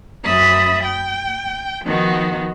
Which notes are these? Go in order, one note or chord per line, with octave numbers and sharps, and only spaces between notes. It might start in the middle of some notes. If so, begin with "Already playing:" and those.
F#2 E5 B5 D#6 A6
G5
D#3 F3 B3 D#4 F#4